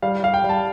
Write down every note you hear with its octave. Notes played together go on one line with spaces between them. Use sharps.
G3 F5
G3 F5
G5
G3
A5